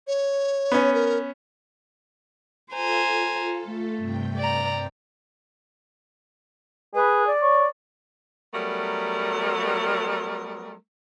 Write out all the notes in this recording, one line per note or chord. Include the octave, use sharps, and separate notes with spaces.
C#5
B3 C#4
A#4
F4 A4 C5 G#5 A#5
A3
G2 C3 G5
D5 A#5
G#4 B4
D5
C#5
F#3 G3 A3 B3 A#4